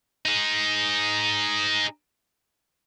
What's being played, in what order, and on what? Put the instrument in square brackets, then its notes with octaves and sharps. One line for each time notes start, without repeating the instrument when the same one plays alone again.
[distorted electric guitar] D#4 G#4